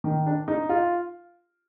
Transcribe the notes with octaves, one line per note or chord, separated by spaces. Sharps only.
D#3
D4
D#4
F4